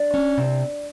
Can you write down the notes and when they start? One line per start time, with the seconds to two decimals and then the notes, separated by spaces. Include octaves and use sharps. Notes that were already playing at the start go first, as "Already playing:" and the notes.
Already playing: D4 D5
0.14 C#4
0.38 C3